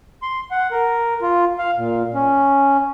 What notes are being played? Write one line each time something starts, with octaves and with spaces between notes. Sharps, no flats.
C6
F#5
A#4
F4
F5
A#2
C#4